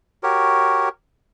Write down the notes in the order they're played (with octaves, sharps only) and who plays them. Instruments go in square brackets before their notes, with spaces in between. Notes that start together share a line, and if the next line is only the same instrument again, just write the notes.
[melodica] F#4 G4 A#4 C#5